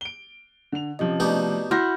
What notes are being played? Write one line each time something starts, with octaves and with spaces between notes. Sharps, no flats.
D7 G7
D3 F7
C3 F3 C#4 G4 D#5
B2 A3 D#4 G4 D5
E4 F#4 C6 F6 G6 A#6